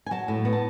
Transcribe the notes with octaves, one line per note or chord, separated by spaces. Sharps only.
G#5
F#3 A5
A2
B3
A5